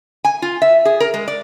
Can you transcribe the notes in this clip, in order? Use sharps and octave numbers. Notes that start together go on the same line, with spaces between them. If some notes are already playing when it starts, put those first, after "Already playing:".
G#5
F4
E5
G#4
A#4
G#3
D5